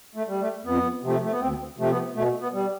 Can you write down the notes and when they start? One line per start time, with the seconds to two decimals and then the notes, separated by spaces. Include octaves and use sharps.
0.15 A3
0.27 G3
0.41 A3
0.65 F2 B3
1.03 C3 F3 A3
1.23 A3
1.32 B3
1.40 D2 C4
1.78 C3 F3 A3
1.91 B3
2.15 B2 A3
2.40 B3
2.53 G3